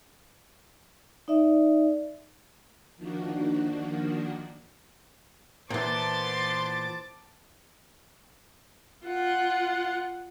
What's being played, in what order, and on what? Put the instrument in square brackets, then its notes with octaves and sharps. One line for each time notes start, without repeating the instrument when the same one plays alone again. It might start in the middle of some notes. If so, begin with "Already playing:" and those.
[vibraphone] D#4 D5 E5
[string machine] D#3 F3 A#3 D4 F#4
[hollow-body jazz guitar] A#2 E3 [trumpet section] B3 C6 [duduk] C5 [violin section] A5 D6 A6
[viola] F4 F#5